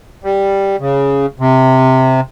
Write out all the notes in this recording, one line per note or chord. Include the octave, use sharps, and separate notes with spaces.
G3
C#3
C3